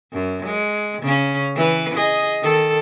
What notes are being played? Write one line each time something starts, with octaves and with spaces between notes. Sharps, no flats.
F#2
G#3
C#3 C#4
E3 B4
G#4 D#5
D#3 A4